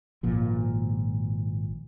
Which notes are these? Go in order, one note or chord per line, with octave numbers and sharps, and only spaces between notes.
G#1 A#2 F3